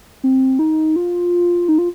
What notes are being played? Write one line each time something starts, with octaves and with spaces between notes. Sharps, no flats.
C4
D#4
F4
D#4
F4